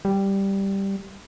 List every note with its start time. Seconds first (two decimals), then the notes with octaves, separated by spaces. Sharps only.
0.05 G3